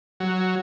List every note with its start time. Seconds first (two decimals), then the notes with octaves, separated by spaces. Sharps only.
0.20 F#3